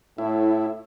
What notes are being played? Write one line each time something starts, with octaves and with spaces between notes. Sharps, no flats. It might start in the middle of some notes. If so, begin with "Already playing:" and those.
A2 E4